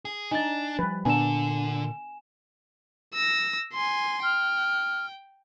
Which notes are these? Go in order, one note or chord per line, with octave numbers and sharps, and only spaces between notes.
G#4
D4 D#4 G#5 A6
F3 G3 B4
A#2 D3 B3 D4 G#5 E7
E6 A#6
G#5 C6
G5 F6